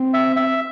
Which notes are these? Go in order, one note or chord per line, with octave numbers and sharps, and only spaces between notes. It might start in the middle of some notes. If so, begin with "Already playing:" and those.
Already playing: C4
E5
E5